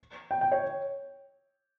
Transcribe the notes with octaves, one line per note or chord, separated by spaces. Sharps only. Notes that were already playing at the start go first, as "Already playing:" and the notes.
G5
G5
C#5